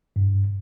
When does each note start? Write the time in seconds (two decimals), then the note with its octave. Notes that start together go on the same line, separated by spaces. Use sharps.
0.16 G2